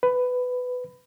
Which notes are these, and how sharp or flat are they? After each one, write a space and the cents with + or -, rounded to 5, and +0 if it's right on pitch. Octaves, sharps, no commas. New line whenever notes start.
B4 +15